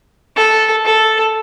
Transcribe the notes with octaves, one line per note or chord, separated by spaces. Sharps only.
A4
A4